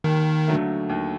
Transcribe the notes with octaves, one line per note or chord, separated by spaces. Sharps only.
D#2 D#3
D3 F#3 A3
D#2